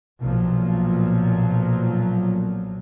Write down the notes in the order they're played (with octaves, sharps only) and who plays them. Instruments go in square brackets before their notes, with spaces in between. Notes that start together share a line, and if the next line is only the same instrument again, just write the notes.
[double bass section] B1 A#2 F3 F#3